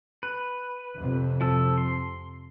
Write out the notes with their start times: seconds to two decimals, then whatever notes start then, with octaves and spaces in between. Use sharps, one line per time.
0.23 B4
0.97 F2 C3
1.41 F3 A4
1.78 C6